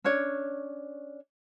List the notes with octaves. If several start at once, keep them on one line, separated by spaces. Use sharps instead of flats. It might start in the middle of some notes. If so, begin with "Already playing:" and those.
C#4 D4 C#5